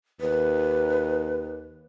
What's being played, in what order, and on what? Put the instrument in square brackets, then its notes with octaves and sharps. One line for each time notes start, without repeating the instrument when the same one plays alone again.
[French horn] D#2 [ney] B4